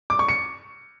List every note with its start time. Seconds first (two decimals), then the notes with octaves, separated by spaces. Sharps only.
0.10 D6
0.19 C#6
0.29 C#7